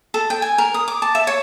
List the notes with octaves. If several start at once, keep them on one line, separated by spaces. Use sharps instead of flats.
A4
G5
G#5
A#4
D#6
D6
A5
E5
C#5